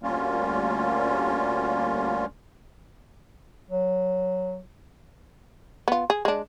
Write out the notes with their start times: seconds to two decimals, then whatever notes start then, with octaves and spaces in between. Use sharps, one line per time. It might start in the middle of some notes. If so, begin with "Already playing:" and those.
0.03 D2 G3 A#3 C#4 F4
3.70 F#3
5.88 B3 F4
6.10 G#4
6.25 G#3 D4